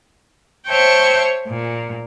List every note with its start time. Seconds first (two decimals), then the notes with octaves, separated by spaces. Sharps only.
0.68 C5 C#5 E5 G5 A5 C#6
1.44 A#2